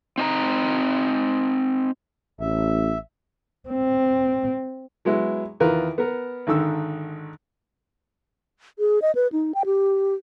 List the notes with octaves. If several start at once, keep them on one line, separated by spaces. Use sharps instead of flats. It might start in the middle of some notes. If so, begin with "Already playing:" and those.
C4 D#4 G#5 A#5
A1 E5
C4
F#3 G#3 B3 E4
E2 D#3 F4 A#4 B4
B3 A#4
G#1 D3 D#3 E6
G#4
D#5
B4
D#4
G5
G4